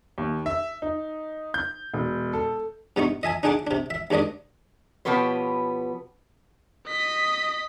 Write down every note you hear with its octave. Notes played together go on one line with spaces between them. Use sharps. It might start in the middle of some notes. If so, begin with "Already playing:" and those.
D#2
E5
D#4
G6
E1
A4
G2 B2 D#4 C#6
D#5 E5 G#5 A5
D4 D#4 G#4 F#5 A5 D6
C3 D4
E5
D#2 G#2 D4 D5 D#5
B2 F3 B3 G4 B4 C#5
D#5 B6